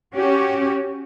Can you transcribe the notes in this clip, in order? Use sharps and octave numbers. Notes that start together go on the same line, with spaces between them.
C#4 F#4 G4 C#5